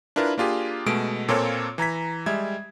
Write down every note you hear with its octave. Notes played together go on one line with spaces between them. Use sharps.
D4 E4 F4 A#4 B4
A#3 D4 F4 G4 G#4
B2 G#3 A3 D7
A#2 A#3 C4 F4 A4 C#5
E3 A#5 G#6 B6
G3 G#3 E5 G#6